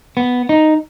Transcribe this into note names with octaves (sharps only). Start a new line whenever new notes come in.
B3
D#4